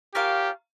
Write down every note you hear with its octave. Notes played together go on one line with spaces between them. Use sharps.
C#4 F4 G4 A#4 F5